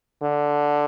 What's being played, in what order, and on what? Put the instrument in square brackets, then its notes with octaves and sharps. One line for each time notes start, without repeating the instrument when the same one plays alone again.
[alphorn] D3